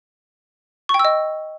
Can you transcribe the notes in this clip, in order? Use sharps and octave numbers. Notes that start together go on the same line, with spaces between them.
C#6
G5
E6
D#5